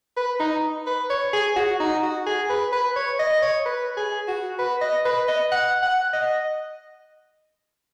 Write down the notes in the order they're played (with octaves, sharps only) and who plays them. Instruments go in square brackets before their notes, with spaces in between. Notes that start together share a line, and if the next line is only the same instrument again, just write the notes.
[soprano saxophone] B4
D#4
B4
C#5
G#4
F#4
D#4
F#4
G#4
B4
B4
C#5
D#5
C#5
B4
G#4
F#4
B4
D#5
B4
D#5
F#5
F#5
D#5